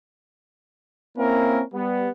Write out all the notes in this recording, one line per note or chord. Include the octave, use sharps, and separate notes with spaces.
A#3 C4 C#4 E4 A#4
G3 B3